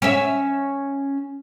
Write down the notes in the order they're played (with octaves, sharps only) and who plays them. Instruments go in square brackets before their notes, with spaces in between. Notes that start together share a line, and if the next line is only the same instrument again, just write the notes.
[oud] C#4 E5